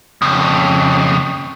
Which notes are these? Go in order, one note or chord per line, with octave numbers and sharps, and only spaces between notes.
F2 C#3